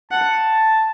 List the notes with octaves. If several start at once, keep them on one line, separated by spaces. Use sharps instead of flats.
F#5 A5